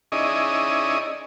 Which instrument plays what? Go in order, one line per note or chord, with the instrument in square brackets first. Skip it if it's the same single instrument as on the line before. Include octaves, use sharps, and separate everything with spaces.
[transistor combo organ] C#4 D#4 E4 G#4 D5 D#5